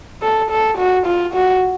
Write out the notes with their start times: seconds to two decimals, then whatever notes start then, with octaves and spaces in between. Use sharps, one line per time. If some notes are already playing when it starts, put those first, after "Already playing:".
0.22 A4
0.50 A4
0.77 F#4
1.06 F4
1.34 F#4